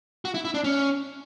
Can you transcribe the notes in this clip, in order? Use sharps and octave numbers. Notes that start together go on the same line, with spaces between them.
F#4
E4
E4
D4
C#4